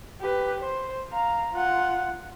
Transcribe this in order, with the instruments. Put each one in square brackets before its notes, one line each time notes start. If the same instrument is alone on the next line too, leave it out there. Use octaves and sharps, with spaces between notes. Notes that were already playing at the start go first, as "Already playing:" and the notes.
[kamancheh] G4 B4
C5
F5 A#5
F4 F#5